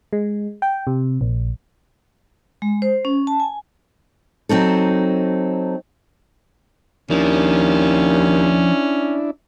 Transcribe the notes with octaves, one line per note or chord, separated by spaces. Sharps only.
G#3
G5
C3
A#1
G#3
C5
C#4
A5
G#5
F#3 C4 D#4 A4
D#2 F3 C#4 D4 E4